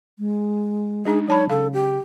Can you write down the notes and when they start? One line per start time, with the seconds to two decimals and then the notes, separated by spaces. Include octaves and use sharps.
0.19 G#3
1.05 G#3 D4 D#4 G#4
1.28 F#3 D#4 C#5 A5 B5
1.50 C#3 A4 F5
1.74 G4